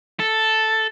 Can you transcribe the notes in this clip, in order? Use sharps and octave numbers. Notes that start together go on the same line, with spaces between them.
A4